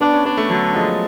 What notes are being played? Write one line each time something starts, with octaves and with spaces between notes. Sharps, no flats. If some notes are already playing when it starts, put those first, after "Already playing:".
B3 D4
C#4
B3 D4
A3
D3 F#3
F3 G#3